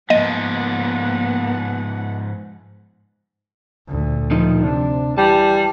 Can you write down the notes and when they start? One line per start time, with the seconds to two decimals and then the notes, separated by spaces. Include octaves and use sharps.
0.10 G#2 F3 A#3 B3 D#5 F#5
3.88 D2 A#2
4.31 A#2 F3 D#4
4.63 C3 D4
5.18 E3 G3 A5